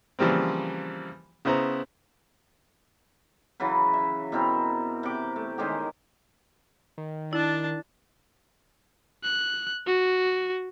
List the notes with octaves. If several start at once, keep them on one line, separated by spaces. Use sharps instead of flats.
C#3 E3 F3 G3 A#3 C4
C#3 B3 E4 C5 A#5
C#3 E3 F#3 B4
E5
B2 E3 C4 A#4
C3 D6
A3
D#3 G#3 C#4 G4
D#3
D4 E4 A5
F#6
F#4